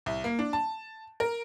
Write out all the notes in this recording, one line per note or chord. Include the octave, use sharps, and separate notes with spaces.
C2
A#3
D4
A5
A#4